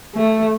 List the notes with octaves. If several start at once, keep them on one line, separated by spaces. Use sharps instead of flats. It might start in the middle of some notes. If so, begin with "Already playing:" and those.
A3